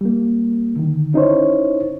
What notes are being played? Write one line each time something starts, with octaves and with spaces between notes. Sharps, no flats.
G3 A#3
D3 D#3
C#4 D#4 E4 C5 C#5